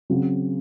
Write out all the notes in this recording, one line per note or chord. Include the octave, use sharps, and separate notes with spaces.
C#3 F#3 C4